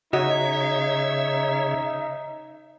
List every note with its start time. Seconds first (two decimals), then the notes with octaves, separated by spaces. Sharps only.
0.13 C#3 D#4 F#4 C#5 D#5 E5